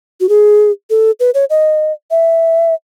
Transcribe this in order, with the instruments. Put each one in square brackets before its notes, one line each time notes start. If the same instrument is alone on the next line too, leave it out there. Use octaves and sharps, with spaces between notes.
[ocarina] F#4
G#4
A4
B4
C#5
D#5
E5